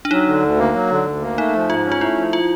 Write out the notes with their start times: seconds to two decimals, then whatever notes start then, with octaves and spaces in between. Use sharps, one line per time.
0.05 D4
0.11 F#3 D#4
0.27 D3
0.42 D2
0.58 A#3
0.74 F#3
0.90 D3
1.06 D2
1.22 A#3
1.38 A3 D#4
1.54 F3
1.70 G#2 F4
1.86 C#4
1.92 F4
2.01 A3 E4
2.18 F3
2.33 F4